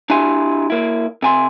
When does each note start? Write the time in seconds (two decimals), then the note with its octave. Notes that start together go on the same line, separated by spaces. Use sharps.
0.10 D4 E4 G4 E5 G#5 C6
0.70 A#3 E4
1.22 C3 G#5 C6